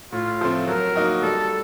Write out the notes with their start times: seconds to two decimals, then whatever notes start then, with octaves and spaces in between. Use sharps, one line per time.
0.13 A2 F4
0.41 F3 A3 C4
0.67 F#3 A#4
0.95 A#3 D#4 F#4
1.23 G3 A4